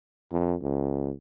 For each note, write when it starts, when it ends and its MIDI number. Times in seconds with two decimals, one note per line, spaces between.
0.32 0.55 41
0.61 1.12 37